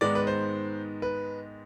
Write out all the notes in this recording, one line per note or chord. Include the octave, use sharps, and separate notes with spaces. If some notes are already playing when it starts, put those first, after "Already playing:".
G#2 D#3 G#3 B3 D5
B4
C5
B4